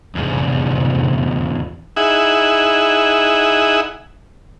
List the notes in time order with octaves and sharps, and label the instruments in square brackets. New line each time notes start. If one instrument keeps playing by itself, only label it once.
[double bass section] F1 [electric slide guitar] E2 G#2
[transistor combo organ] D#4 E4 G#4 E5 F#5